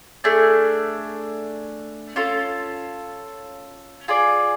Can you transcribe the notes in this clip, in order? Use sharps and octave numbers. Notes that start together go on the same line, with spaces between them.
A3 D4 G#4
C#4 F4 A4
F4 G#4 D5